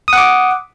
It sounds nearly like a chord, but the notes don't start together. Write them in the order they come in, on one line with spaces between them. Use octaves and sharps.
D#6 F#5 D6